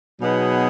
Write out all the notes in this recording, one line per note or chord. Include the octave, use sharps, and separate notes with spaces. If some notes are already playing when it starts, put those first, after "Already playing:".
B2 F#3 B3 D#4 G#4